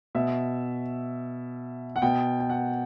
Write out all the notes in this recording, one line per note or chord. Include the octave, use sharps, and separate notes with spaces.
B2 E5
F#5
B2 G5
G5
F#5